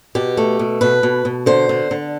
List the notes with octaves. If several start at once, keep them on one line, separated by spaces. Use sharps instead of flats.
B2 G4
A3
B2
B2 B4
B2
B2
D3 C5
D3
D3